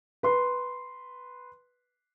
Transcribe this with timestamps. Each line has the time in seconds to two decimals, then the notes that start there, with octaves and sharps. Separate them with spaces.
0.23 B4 C6